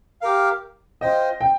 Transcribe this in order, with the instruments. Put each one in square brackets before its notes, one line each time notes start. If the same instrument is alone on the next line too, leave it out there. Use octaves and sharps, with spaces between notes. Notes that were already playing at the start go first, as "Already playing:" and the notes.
[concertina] G4 A#4 F5
[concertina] F4 C5 G5 [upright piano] D#5
[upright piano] G5